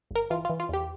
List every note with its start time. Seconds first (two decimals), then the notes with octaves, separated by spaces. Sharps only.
0.11 G1 A#4
0.30 E3 F4
0.45 F4
0.50 E3
0.60 F4
0.69 E2 G4